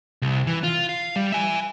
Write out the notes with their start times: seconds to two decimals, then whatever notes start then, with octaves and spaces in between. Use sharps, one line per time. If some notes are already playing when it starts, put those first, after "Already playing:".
0.22 C2
0.47 E3
0.63 F4
0.89 F5
1.16 G3
1.32 E5 G#5